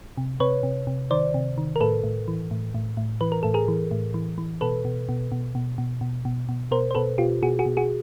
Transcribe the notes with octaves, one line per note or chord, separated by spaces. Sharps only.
C3
C3 B4 C#5
C3
C3
D#3 C5 D5
C3
D#3
A#4
A2 A4 B4
A2
E3
A2
A2
A2
E3 B4
A#4
A2 A4
G#4 A#4
E3
A2
E3
E3
B2 A4 B4
B2
B2
B2
B2
B2
B2
B2
B2
B2 A#4 C5
C5
B2 A4 B4
B2 F4 G4
B2 F#4 G#4
F#4 G#4
B2
F#4 G#4